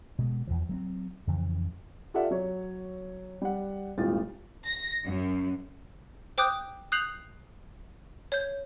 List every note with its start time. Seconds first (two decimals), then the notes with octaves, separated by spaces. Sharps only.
0.19 B2 G#3
0.47 E2 E3 F3
0.69 F#3 A#3 C4
1.27 F2 C#3 E3
2.14 F4 G4 A4 D5 E5 F#5
2.31 F#3 C#5
3.42 G3 F#5
3.98 D#1 G#1 E3 F4 A6
4.66 A#6
5.05 F#2
6.38 C5 G5 D6 D#6 F#6 G6
6.92 D#6 F#6 G6 C7 F7 F#7
8.32 C#5 G6